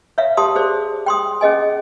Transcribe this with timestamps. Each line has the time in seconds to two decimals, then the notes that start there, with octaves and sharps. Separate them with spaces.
0.18 C#5 E5 F5
0.37 G4 F5 A5 C6 D#6
0.56 G#4 C5 D5
1.06 G5 C6 D#6
1.41 C#4 G#4 D#5 G#5